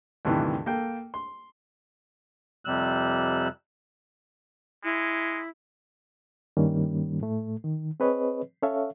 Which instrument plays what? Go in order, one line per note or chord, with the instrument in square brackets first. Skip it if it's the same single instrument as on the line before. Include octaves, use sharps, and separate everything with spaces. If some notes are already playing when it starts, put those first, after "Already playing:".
[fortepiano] D2 G2 C3 D#3 E3
A#3 A4 G5
C6
[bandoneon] F2 C3 G3 E6 F#6
[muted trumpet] G#3 [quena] E4
[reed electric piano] G2 D#3 G3 A#3 C#4
A2 A3
D#3
C4 G#4 B4 C#5 D#5
C#4 A4 C#5 E5 F5